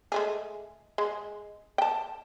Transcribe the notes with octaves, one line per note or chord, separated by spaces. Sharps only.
G#3 A3 G#4
G#3
G5 A5